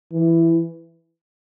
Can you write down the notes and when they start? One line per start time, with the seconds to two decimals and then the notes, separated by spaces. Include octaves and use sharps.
0.12 E3